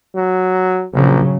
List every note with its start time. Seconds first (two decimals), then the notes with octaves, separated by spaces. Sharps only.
0.16 F#3
0.93 A#1 C#3 F#3